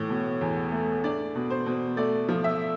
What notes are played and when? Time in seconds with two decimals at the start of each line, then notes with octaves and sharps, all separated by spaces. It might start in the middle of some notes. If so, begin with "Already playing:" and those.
Already playing: A2 E3
0.10 B2
0.41 E2
0.72 A3
1.04 D4 D5
1.35 B2
1.50 C5
1.66 B2
1.97 A3 D5
2.29 F3
2.44 E5